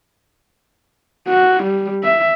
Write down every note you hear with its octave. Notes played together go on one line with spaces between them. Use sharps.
F#4
G3
E5